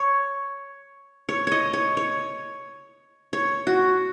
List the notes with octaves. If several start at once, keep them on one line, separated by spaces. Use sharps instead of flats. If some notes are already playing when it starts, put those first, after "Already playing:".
Already playing: C#5
C#5
C#5 D#5
C#5
C#5
C#5
F#4